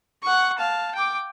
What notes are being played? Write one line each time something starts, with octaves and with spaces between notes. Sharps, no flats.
F#5 C#6
F5 A5
G5 D6